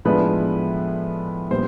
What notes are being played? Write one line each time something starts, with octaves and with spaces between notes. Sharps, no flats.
A2 F3 G#3 B3 D4 B4
A#2 G3 B3 D4 C5